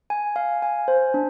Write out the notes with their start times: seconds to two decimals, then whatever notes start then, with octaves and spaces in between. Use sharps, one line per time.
0.10 G#5
0.36 F5
0.62 G#5
0.88 C5
1.14 D4